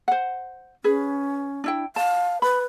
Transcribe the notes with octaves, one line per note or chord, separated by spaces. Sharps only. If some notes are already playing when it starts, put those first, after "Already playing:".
C5 F#5
C#4 G#4 B4
D4 E4 G5
F5 A5
B4 B5